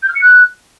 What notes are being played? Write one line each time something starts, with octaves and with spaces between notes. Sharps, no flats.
G6
F6
C#7
F#6